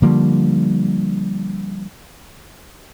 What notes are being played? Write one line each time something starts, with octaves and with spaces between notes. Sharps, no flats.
D3 F3 G3 A#3